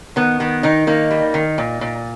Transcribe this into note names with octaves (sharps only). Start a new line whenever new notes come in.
D#3 B3
D#3 B3
D#3 D#4
A#3 D#4
G3
D#3
A#2
A#2